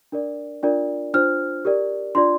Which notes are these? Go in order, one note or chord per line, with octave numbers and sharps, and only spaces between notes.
D4 A#4 D5
D4 F4 A#4 D5
D4 F4 C5 F6
G4 A#4 D5
D4 F4 D5 C6